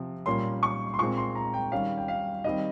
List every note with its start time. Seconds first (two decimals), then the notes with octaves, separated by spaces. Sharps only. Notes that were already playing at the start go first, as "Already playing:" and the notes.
Already playing: C3 F3 C4
0.26 A#2 G3 A#3 C#4 C6
0.63 C#6
0.94 C6
0.99 A#2 G#3 C4 C#6
1.17 C6
1.35 A#5
1.54 G5
1.72 D#3 G3 C#4 F5
1.98 G5
2.08 F5
2.44 D#3 G3 C4 D#5